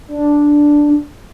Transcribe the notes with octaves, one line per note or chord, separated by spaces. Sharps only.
D4